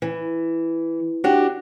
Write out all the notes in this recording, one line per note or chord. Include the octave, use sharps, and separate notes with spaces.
E3
D4 F#4 G4